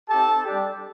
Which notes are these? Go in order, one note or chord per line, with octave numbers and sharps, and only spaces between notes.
C4 D#4 G4 A4 A5
G3 D4 G4